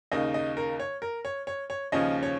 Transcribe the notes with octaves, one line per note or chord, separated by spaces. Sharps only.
D#2 C#3 A#3 D#4 D#5
D#5
A#4
C#5
A#4
C#5
C#5
C#5
D#2 C#3 F3 C#4 D#5
C#5